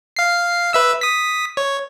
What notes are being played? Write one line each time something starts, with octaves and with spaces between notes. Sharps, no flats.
F5 C7
B4 E5 E6
D#6 B6
C#5